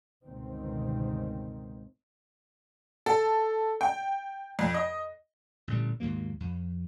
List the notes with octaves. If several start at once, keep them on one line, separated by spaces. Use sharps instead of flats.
G1 C#2 B2 D#3 C4
A4
G5
F2
D#5
A1 A#2 D3 G3
D#2 G#2 F#3 A#3
F2